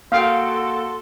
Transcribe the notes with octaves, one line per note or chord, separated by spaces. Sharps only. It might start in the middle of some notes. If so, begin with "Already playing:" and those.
A#3 F#4 A4 F5 G5 C6 D7